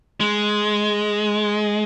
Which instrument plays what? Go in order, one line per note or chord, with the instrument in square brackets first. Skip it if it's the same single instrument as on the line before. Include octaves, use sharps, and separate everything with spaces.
[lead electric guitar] G#3